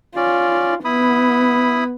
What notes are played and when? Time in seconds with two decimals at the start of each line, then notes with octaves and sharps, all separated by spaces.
0.16 C#4 F4 D5
0.85 B3 E4 B5 D#6